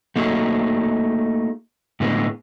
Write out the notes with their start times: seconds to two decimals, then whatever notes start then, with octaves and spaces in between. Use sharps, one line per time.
0.16 A3 A#3 D#4 F#4 G#4
2.00 A2 D3 G#3 B3